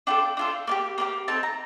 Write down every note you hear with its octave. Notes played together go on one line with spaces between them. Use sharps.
D4 F4 A4 G5
D4 F4 A4
A#3 D4 G4
A#3 D4 G4
C4 D#4 A4 A5
A#5